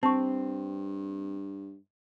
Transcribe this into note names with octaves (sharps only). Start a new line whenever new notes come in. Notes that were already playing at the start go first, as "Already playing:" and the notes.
G2 C4 A5 C#6